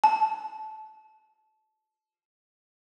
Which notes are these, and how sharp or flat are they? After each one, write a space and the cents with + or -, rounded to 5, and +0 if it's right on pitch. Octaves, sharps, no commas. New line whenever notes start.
A5 -20